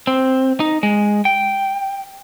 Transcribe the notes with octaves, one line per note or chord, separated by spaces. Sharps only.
C4
D#4
G#3
G5